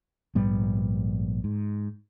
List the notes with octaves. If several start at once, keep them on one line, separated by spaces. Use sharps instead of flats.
A#1 G#2 G3 B3
G#2